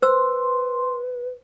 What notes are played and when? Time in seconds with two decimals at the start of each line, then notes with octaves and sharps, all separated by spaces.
0.02 B4 C5 C6 E6